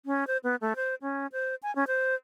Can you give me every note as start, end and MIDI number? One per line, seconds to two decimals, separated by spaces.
0.06 0.27 61
0.27 0.37 72
0.44 0.56 59
0.61 0.73 57
0.76 0.95 72
1.02 1.27 61
1.32 1.55 72
1.63 1.74 80
1.76 1.84 61
1.87 2.15 72